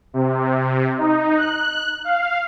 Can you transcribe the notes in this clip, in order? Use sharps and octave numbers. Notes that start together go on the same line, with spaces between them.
C3
D#4
F#6
F5